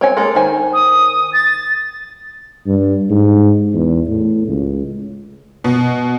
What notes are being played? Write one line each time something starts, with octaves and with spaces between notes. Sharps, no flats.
C4 C#5 G#5
G#3 A#3 A4
D#3 C5 G#5
D#6
A6
G2
G#2
E2
A2
C#2
B2